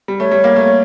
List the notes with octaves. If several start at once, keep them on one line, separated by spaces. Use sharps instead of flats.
G3
A3 C#5
G3
A#3
A3